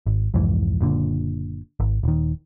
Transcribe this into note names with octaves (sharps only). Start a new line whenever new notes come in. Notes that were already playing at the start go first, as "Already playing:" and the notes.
G#1
C2 F2 G#2 E3
F#1 A#2 D3
G#1
D#1 D#3